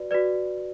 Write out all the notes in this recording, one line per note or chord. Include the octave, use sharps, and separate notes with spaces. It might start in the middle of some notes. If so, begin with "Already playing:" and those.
Already playing: F#4 B4 D5
F#4 B4 D5